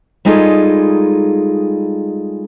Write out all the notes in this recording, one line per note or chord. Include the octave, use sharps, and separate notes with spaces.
G3 G#3 D#4 F4 G#4 A4